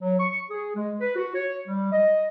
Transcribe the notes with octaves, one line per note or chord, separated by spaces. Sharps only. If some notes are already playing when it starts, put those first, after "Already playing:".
F#3
C#6
G#4
G#3
B4
F#4
C#5
G3
D#5